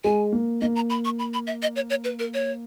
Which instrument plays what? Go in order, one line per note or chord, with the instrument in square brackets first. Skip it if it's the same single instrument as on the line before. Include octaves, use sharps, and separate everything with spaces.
[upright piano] G#3 [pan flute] G#5
[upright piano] A#3
[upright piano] A#3 [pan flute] D#5
[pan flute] A#5
B5
C#6
B5
B5
E5
D#5
C#5
C#5
B4
A#4
C#5